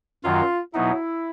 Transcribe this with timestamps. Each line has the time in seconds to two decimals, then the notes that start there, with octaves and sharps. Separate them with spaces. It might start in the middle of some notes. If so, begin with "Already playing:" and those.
0.24 F#2 D#3 F#3 F4
0.74 B2 F#3 B3 D#4 E4